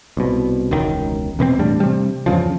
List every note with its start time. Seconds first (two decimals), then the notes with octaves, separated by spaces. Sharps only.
0.17 C2 B2
0.71 E1 C#2 D#3
1.39 E2 B2 A#3 C4
1.59 E2 A2 G3 D4
1.80 C3 G3
2.26 E2 G2 C#3 F3